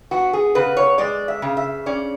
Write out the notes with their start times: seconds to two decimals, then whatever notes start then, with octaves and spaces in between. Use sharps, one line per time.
0.11 B3 F#4
0.33 G#4
0.55 C#3 B4
0.77 C#5
0.98 G#3 D5
1.28 E5
1.42 C#3
1.57 E5
1.86 C#4 D5